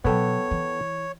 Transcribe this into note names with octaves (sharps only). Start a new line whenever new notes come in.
B2 F#3 B3 A4 C#5 G5
E3